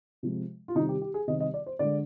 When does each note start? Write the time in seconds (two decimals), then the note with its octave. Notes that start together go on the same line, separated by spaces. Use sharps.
0.23 C3 F3 G#3
0.68 F4
0.75 C3 D#3 G3 D#4
0.89 G4
1.02 G4
1.14 G#4
1.28 C3 D#3 G3 D#5
1.40 D#5
1.54 D5
1.66 C5
1.79 D3 G#3 D5